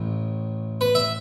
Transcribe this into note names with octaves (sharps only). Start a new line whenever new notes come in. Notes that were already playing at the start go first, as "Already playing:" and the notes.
Already playing: A1 A2
B4
E5